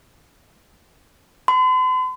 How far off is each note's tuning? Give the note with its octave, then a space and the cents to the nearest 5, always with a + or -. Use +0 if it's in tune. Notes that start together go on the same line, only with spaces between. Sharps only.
C6 -45